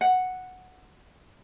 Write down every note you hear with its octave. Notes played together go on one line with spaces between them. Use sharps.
F#5